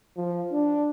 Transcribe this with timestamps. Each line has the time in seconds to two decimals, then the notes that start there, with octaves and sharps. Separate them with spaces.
0.17 F3
0.53 D4